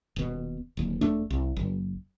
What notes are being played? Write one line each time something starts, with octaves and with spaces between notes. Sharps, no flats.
D#1 B2
D1 D#2
E1 A3 D4
C2
F#1